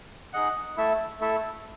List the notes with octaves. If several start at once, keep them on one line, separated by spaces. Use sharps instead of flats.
D#4 G#4 D#5 F#5
A3 E4 A4 E5
A3 E4 A4 E5